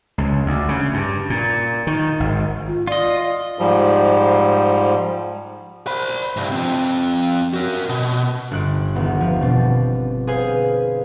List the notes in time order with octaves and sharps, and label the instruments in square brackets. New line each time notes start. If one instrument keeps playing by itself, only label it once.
[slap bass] C#2
D2
C#3
G2
A#2
D#3
G#1
[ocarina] F4
[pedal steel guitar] F4 D#5 [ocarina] D5
[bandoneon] G#2 F3 G3
[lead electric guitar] C5 B5
C2 G2
F3 C4
F#4 A#4
B2
[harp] G1 F#6 D7
D#1 E2 B3
F3 B3
B2 C4 D4
G#4 B4 C5 F5 G#5